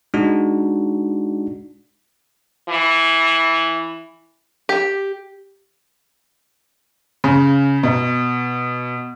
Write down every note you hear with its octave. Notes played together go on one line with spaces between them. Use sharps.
G#3 D4 D#4 F#4
E3
G4
C#3
B2